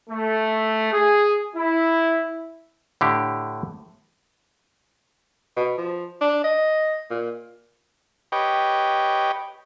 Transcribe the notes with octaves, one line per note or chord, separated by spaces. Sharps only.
A3
G#4
E4
A2 D3 G4
B2
F3
D4
D#5
A#2
G4 B4 C#5 D#5 G5